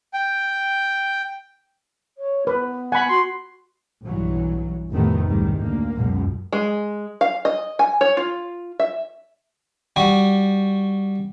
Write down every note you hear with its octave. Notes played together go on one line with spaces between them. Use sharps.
G5
C#5
B3 B4
F#5 G#5 B5
F#4 C6
B1 G2 E3 F#3
F1 A2 C3 D#3 A3 B3
C#2 G#2 D#3 G3
D2 A#3
C#2 F#2 B2
G#3
F5
D#5
G#5
C#5
F4
E5
G3 F#4